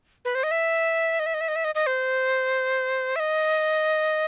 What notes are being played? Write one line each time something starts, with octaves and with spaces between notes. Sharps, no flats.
B4
C5
D#5
E5
D#5
E5
D#5
E5
D#5
E5
D#5
D#5
C5
E5
D#5